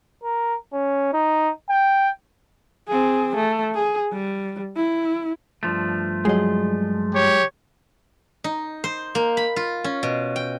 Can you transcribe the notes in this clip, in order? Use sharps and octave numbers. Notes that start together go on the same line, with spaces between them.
A#4
C#4
D#4
G5
C4 G#4
A3
G#4
G3
E4
G2 F3 A3
F#3 G#3 G#4 D#5
G4 C#5
D#4
C5
A#3
B5
F4
C#4
B2
G5